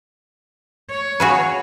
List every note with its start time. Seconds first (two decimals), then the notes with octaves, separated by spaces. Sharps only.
0.90 C#5
1.20 F#4 G#4 B4